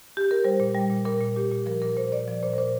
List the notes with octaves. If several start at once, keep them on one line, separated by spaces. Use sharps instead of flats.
G4
A#4
G3 C5
A#2
G3
A#2
A#2 A#4
A#2
A#2 G4
A#2
F3 A#4
A#2 A#4
A#2 C5
A#2 D5
F3 D5
A#2 C5
A#4
A#2 C5